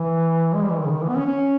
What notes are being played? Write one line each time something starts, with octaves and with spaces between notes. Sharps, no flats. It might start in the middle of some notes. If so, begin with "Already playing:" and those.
Already playing: E3
G#3
G3
E3
D#3
C#3
D#3
E3
B3
C#4
C#4